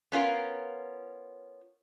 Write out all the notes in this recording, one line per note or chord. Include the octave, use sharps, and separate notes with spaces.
B3 C#4 F4 A#4